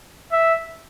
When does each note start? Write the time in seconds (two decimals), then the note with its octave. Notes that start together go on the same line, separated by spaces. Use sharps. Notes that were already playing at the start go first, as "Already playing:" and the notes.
0.33 E5